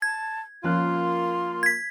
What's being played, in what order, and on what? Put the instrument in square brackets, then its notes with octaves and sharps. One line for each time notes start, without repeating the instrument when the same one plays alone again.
[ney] A5 [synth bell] G#6
[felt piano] F3 C#4 F#6 [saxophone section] A#3 F4 [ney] C6
[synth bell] G#6 B6